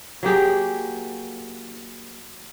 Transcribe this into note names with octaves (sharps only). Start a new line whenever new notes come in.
F#3 A#3 G4 G#4